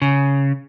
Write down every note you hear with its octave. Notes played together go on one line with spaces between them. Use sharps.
C#3